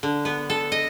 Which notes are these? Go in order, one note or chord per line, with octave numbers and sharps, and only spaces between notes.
D3
B3
A4
D#5